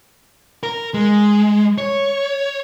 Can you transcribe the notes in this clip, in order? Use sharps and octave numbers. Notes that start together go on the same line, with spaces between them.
A#4
G#3
C#5